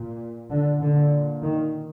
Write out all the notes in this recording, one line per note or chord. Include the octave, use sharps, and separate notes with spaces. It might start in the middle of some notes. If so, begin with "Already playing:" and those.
Already playing: A#2
D3
A#2 D3
D#3